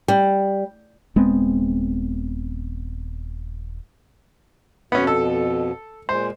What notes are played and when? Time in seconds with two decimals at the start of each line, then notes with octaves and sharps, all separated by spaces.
0.08 G3
1.16 D#1 G#3 B3 C4
4.92 F2 B2 B3 C#4
5.07 A4
6.09 A#2 G#3 C5